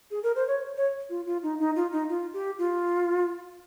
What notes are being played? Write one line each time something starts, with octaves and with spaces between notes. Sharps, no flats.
G#4
A#4
C5
C#5
C#5
F4
F4
D#4
D#4
F4
D#4
F4
G4
F4